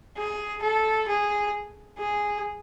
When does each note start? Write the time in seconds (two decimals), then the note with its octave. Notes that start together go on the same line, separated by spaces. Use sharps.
0.17 G#4
0.62 A4
1.08 G#4
1.99 G#4